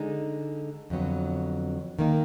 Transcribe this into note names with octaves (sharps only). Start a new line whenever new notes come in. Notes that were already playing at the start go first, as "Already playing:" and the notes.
Already playing: D3 G#3 D#4
F2 D3 F#3 B3
D#3 A#3 D#4